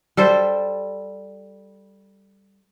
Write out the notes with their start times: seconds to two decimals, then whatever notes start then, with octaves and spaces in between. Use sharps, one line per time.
0.17 G3 A4 C5